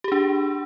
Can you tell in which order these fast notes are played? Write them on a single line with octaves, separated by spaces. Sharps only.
G4 G#4 D4